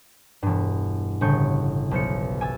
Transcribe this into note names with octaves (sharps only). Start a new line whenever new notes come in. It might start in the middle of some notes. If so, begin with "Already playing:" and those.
E1 G2
G1 A2 C#3 C#6 G6
B1 C5 C#7
G#5 E6 A6